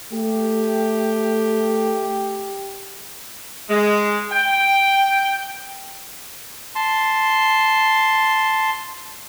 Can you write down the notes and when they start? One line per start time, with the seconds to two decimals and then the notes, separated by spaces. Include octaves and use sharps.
0.14 A3 G4
3.69 G#3
4.31 G5
6.75 A5 C6